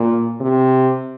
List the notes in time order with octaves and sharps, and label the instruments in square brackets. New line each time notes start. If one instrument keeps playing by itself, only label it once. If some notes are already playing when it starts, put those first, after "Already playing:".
Already playing: [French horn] A#2
C3